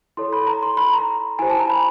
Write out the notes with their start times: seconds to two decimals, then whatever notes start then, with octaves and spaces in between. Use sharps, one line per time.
0.17 E4 A4 C#5 C6
0.33 B5
0.47 A#5
0.63 C6
0.77 B5
0.93 A#5
1.39 E4 G4 C5 G#5
1.50 A5
1.59 A#5
1.70 B5